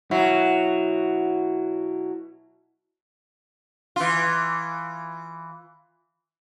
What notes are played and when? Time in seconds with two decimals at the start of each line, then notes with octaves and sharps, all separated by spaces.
0.11 B2 F#3 E4
3.96 E3 F4